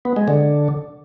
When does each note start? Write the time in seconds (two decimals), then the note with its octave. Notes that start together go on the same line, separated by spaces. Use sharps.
0.05 B3
0.16 G#3
0.28 D3